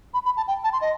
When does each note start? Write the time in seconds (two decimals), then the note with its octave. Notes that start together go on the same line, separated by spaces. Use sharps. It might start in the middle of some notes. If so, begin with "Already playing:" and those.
0.14 B5
0.25 B5
0.37 A5
0.47 G5
0.64 A5
0.73 C6
0.81 D#5